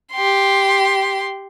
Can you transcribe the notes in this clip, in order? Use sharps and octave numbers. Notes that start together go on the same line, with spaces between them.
G4 C6